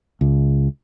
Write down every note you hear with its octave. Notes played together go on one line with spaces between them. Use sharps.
C#2